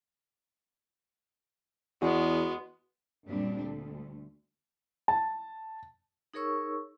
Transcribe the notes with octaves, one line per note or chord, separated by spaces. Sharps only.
E2 G#3 B3 F#4
F#2 A#2 G3 C4 D4
D2
A5
D#4 G#4 A#4 C#5 C#6 E6